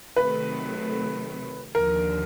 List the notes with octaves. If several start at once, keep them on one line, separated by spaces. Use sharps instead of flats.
C3 D#3 F#3 A3 B4
D#2 D3 F3 A#4